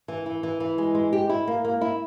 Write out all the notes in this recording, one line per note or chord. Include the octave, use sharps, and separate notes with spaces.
E3
E3
E3
E3
G#3
G#3
G4
E4
A#3
A#3
E4